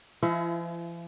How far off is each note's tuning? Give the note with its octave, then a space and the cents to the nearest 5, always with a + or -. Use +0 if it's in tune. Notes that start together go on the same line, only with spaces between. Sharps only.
F3 -45 E4 +40 E5 -40